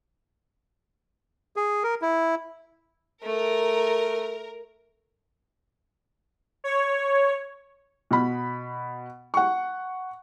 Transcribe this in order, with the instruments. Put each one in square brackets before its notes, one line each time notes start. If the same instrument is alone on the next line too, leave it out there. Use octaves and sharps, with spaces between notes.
[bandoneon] G#4
A#4
E4
[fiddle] A3 [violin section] A#4
[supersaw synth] C#5
[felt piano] B2 B5
F#5 C#6